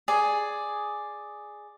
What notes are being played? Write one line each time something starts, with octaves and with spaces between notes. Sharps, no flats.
G#4 D5